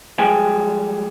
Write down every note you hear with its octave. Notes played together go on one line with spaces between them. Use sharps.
F3 G3 G#3 G#4 G5 G#5